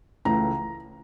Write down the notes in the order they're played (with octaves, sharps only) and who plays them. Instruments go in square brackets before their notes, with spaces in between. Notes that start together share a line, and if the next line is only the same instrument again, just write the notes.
[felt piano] C#2 C#3 E3 A3 A#5